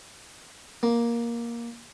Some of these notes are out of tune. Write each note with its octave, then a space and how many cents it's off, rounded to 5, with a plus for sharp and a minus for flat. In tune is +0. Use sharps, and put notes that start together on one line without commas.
A#3 +10